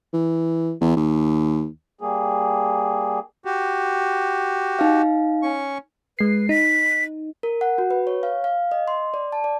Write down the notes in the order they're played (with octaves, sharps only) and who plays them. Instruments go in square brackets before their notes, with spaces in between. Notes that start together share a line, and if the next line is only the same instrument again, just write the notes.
[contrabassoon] E3
E2
D#2
[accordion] G3 A#3 G#4
F#4 G4
[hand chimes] D#4 F5
[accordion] C#4 C#6
[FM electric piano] G#3 C7 [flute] B4
[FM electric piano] D#4 [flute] B6
[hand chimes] A#4
F#5
F#4
B4
C#5
F5
F5
D#5
C6
D5
A5
D5